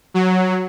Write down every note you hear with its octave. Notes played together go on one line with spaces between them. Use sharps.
F#3